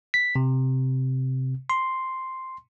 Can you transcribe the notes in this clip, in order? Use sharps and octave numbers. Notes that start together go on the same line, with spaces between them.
B6
C3
C6